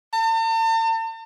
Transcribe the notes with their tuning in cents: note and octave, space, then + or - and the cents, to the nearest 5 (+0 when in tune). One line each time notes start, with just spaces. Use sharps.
A5 +45